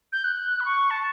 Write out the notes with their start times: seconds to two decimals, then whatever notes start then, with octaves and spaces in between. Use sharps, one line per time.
0.13 G6
0.24 F#6
0.60 B5
0.65 C#6
0.91 A5